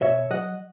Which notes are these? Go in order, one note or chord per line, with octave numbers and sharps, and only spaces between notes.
B2 C#5 E5
F#3 D#5 F#5